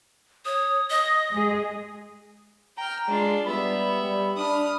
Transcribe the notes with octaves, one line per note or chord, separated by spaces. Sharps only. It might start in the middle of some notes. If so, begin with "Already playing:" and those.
C#5 D#6
D#5
G#3 G#4
G5 A#5 F6
G#3 D4 F4
G3 B3 E5 B5
G3
D4 D#6 F6